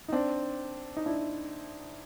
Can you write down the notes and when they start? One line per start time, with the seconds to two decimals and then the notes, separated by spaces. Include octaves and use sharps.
0.08 D#4
0.12 C4 D4
0.97 D#4
1.06 D4 E4